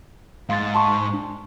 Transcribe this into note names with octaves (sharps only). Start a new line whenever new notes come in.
G#2 F5 C6 A6
A5 C6 C#6
D4